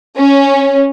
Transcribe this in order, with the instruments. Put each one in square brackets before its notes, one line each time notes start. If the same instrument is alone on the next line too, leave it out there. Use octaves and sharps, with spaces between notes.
[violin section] C#4